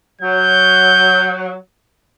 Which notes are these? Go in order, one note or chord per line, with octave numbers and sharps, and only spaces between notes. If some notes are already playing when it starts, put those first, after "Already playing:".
F#3 G6